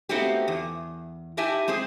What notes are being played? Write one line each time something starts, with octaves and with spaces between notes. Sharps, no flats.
A3 B3 C4 D#4 F#4 G4
E2
D#4 E4 G4 E5 G#5 A5
G#3 C4 G#4 C5